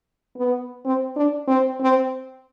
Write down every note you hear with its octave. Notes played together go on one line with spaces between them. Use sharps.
B3
C4
D4
C4
C4